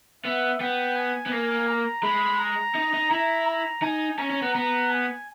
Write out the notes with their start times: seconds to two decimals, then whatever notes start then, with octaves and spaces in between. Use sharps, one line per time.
0.24 B3 E5
0.60 B3 G5
0.96 G#5
1.26 B3
1.32 A#3
1.68 A#5
2.03 G#3 B5
2.39 A#5
2.75 D#4
2.93 D#4
3.11 E4 A#5
3.47 A#5
3.82 D#4 G#5
4.18 C#4 A#5
4.30 C#4
4.42 B3
4.54 B3 A#5
4.90 G#5